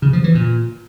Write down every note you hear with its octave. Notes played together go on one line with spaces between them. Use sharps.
C#3
F3
E3
A#2